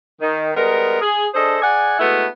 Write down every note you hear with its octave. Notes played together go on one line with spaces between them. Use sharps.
D#3
G3 G#3 B3 A#4
G#4
D4 G#4 A4 C5 D#5
G#4 D5 F#5 G#5
G#3 A3 B3 E4 F#4